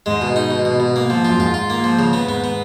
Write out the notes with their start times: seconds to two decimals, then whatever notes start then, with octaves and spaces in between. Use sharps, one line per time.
0.06 G#2 G#3
0.21 B2
0.36 D#4
0.51 B2
0.65 B2
0.80 B2
0.96 A#3
1.10 F3
1.25 F#2 F4
1.39 G#2 F4
1.54 F4
1.70 A#3
1.84 F3
1.99 C#3
2.13 B3
2.28 G#2 B3
2.44 B3